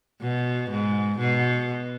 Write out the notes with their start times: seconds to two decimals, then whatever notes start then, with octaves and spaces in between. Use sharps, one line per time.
0.21 B2
0.70 G#2
1.19 B2